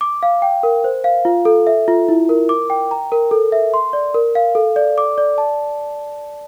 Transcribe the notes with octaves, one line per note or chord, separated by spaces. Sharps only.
D6
F5
G5
A#4
C5
F5
F4
A4
E5
F4
E4
A#4
D6
G5
A#5
A#4
A4
E5
C6
D5
A#4
F5
A4
D5
D6
D5
A5